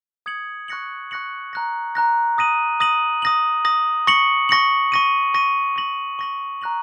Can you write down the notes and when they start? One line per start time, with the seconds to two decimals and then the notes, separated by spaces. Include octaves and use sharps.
0.26 D#6 G#6 C#7 F#7
0.68 C#6 F#6 A#6 C#7 F#7
1.11 C#6 F#6 A#6 C#7 F#7
1.53 A#5 F#6 A#6
1.95 A#5 F#6 A#6
2.38 D#6 A#6 D#7 F#7
2.80 D#6 A#6 D#7 F#7
3.22 D#6 A#6 F#7
3.65 D#6 A#6 F#7
4.07 C#6 A#6 C#7 F#7
4.49 C#6 A#6 C#7 F#7
4.92 C#6 A#6 D#7
5.34 C#6 A#6 D#7
5.76 C#6 A#6 F#7
6.19 C#6 A#6 F#7
6.61 A#5 F#6 A#6 F#7